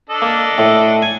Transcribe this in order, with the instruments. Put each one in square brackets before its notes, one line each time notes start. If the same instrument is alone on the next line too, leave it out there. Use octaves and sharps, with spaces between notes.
[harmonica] D4 A4 D#5
[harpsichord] A#3
A2
G#5